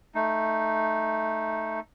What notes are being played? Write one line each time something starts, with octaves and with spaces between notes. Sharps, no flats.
A3 D#4